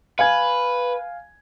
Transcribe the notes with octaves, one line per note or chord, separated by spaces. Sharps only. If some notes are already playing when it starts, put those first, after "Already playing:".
B4 F5 G#5 G#6